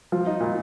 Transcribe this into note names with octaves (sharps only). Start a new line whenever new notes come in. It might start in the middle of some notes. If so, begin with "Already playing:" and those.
F3
D#4
A#2